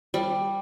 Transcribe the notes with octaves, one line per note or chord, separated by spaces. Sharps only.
G3